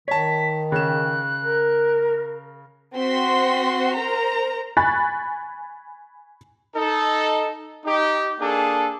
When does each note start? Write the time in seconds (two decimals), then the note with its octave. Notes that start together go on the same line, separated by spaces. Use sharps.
0.08 D#3 C#5 A5 B6
0.72 C#3 F#6 E7
1.43 A#4
2.95 C4 F#4 C6 B6
3.96 A#4 C5 A#5
4.77 G#5 B5 C#6 F#6 A6
6.75 D#4 A4
7.85 D#4 G4
8.40 A#3 D4 G#4 A4